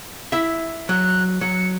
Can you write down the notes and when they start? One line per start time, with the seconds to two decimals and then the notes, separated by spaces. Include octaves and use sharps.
0.32 E4 E5
0.89 F#3 F#6
1.41 F#3 C#7